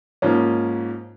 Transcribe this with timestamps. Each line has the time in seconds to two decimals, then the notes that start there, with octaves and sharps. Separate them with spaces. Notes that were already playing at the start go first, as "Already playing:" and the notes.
0.22 G#2 F3 A#3 C#4